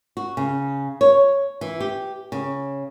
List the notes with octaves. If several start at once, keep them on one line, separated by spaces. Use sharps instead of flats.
F#4
C#3
C#5
E3
G4
C#3